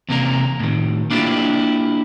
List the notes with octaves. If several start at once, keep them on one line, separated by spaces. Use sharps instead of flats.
E2 C3 A#3 A#4
A2 D#3
A#3 D4 E4 F4 G4